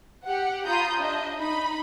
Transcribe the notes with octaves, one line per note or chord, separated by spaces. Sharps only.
G4 F#5
F4 A#5 B5 D#6 G6
D4 D#5 E5
D#4 B5